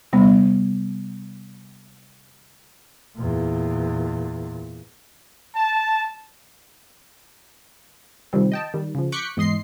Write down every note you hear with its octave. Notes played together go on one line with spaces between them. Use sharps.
C3 G3 B3
E2 A#2
A5
C3 D#3 F3 G3 C4
D#5 G5 A5
D#3 G3
C#3 F3
C#6 D6 F#6 G6 B6 C#7
E2 G#2 D#5 C6 C7